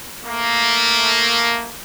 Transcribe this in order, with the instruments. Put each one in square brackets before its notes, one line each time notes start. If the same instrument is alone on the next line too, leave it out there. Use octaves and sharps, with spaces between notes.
[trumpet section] A3 A#3